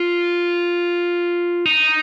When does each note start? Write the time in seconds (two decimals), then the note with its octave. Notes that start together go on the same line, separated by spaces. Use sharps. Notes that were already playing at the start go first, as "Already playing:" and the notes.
Already playing: F4
1.66 D#4